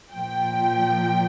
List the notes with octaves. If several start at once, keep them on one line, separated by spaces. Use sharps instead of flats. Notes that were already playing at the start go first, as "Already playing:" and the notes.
A#2 F3 G5